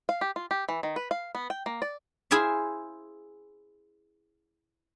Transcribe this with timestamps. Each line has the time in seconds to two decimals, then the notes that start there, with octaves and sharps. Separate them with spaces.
0.09 F5
0.21 G4
0.36 F4
0.51 G4
0.69 E3
0.83 D#3
0.96 B4
1.11 F5
1.35 B3
1.50 G5
1.66 A#3
1.82 D5
2.31 E4 G#4 C5 E5 F5